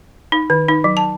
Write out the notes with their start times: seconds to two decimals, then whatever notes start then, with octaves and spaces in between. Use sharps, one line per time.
0.32 D#4
0.50 D#3
0.68 D#4
0.84 F#3
0.97 A5